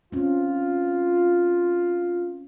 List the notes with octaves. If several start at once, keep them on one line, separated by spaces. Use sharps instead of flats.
C4 C#4 F4